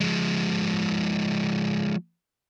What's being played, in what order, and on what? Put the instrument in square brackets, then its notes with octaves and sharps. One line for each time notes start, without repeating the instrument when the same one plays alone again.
[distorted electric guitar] F3 G#3